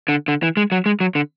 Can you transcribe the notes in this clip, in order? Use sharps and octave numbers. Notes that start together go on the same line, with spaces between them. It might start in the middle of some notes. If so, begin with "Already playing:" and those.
D3
D3
E3
G#3
F#3
G#3
F#3
D3